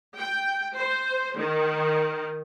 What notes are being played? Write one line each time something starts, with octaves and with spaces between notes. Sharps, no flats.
G5
C5
D#3